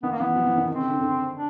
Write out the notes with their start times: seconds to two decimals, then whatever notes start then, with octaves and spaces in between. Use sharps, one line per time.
0.03 D#3 B3
0.12 A#3
0.20 E3 B3
0.36 F3
0.47 E3
0.57 D#3
0.67 D#3 C4
0.78 C#3
0.90 D3
1.01 D3
1.33 D4